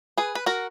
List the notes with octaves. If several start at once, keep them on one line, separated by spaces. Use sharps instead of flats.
G#4 B4
B4
F#4 A#4